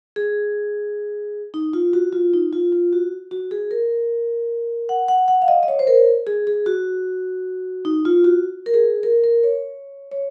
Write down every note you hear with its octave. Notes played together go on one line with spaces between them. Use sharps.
G#4
D#4
F4
F#4
F4
D#4
F4
F4
F#4
F#4
G#4
A#4
F#5
F#5
F#5
F5
D#5
D#5
C#5
C5
A#4
G#4
G#4
F#4
D#4
F4
F#4
A#4
G#4
A#4
A#4
C#5
C#5